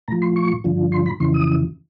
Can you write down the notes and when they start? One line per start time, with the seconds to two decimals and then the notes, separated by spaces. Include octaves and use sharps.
0.08 A2 F3 A#5
0.22 C6
0.36 C#6
0.64 G2 D3 F3
0.92 C6
1.06 B5
1.20 F2 C#3 E3 C6
1.34 D#6